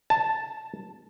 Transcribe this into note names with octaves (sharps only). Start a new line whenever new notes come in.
A5